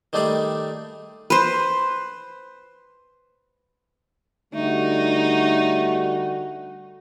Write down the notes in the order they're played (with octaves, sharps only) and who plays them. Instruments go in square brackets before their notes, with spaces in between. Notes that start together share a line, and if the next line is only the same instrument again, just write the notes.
[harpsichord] D#3 G3 A3 G#4 D5
[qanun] B4 C5
[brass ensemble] D3 G3 F#4 [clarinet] A3 [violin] D#4